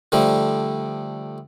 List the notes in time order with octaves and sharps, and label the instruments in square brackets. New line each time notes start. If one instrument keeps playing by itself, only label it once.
[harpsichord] D3 F3 G3 A3